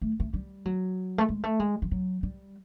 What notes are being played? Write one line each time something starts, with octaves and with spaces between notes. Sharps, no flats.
A3
A3
G3
F#3
A3
G#3
A3
G#3
F3
F#3
G3